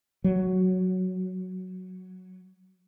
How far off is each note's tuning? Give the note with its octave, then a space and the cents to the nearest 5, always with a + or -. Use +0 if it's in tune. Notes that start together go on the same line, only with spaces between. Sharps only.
F#3 +0